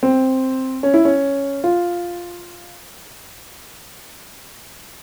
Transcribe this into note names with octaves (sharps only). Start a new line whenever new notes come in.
C4
C#4
E4
C#4
F4